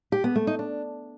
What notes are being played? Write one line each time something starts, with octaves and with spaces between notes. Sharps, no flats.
G4
B3
A3
D#4
D4